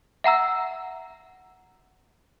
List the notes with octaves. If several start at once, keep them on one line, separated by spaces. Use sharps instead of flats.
E5 F#5 A#5 E6